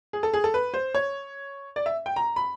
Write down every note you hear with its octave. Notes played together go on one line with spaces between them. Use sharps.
G#4
A4
G#4
A4
B4
C5
C#5
D5
E5
G5
A#5
B5